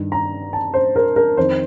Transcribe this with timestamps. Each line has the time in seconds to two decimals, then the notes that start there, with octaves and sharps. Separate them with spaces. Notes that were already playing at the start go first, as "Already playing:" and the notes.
Already playing: G2 D#3
0.12 A#5
0.53 A5
0.74 C5
0.96 A#4
1.16 A#4
1.37 F2 D#3 C5